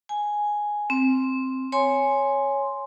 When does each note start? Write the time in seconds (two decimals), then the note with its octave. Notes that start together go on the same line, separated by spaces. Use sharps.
0.09 G#5
0.90 C4
1.72 C#5 G#5 C6